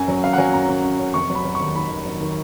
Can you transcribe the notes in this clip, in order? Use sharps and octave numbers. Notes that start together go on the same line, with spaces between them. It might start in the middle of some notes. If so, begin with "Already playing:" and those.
Already playing: F#2 G#5
F#3
F#2 F5
F#5
F#3 G#5
F#2 A#5
F#2
C#4
C#4
F1 C#6
F#3
B5
F#3
C#6
D#2
D#3 B5
D#2
F#3
D#3